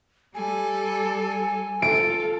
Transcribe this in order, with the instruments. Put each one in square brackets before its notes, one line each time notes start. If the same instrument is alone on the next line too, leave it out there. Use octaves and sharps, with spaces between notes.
[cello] G3 A4 [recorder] G#5
[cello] F4 [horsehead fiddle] A4 [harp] D7